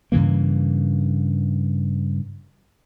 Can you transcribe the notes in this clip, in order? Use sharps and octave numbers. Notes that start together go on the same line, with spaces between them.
G2 C#3 E3 A#3